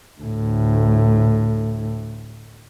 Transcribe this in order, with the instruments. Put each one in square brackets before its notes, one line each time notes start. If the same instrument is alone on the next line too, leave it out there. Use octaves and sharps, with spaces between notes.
[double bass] D2 A2